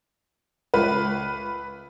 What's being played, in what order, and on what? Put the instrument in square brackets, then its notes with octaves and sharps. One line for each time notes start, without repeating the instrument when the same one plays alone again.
[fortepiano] C#2 [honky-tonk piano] B4